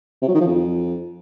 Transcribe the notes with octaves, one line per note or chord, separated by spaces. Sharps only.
C3
F#3
D#3
F3
F2